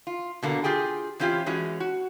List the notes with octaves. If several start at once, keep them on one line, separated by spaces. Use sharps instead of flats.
F4
B2 D3 A#3
F4 G4 G#4 G5
E3 C4 C#4 F4 G4
E3 G#3 C#4 F#4
F#4